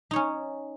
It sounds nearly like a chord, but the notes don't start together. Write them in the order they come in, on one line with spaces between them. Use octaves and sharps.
D#4 C#5 C#4